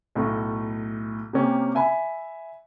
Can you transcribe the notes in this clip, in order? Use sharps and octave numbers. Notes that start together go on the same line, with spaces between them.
B1 A2 A3
C3 A#3 C#4 G4
E5 G#5 B5